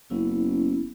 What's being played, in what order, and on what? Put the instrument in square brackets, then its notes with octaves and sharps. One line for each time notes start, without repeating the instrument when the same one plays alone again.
[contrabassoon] F#1 [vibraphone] B3 C#4 E4